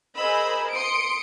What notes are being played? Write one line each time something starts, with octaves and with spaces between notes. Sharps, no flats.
G#4 A#4 C5 D#5 B5 E6
C6 D#6 C#7 D7